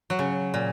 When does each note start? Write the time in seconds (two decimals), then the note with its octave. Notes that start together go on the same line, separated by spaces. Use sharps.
0.10 F#3
0.19 C#3
0.54 A#2